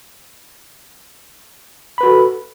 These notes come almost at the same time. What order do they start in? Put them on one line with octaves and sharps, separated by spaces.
B5 B4 F#4 A4